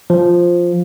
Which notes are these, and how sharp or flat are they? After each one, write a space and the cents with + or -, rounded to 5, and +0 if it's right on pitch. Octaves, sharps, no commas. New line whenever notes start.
F3 +0